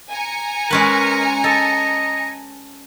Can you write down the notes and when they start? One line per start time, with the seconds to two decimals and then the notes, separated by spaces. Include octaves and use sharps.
0.10 G#5 A#5 C#7
0.71 G#3 C#4 A#4 B4
1.44 A4 D#5